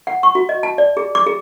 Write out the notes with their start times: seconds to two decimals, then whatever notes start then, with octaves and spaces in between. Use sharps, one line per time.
0.07 F#5
0.23 C#6
0.35 F#4
0.49 D#5
0.63 A5
0.78 D5
0.97 G#4
1.15 D6
1.26 G#4